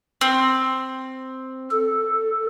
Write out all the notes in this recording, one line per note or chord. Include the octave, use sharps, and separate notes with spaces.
C4
A4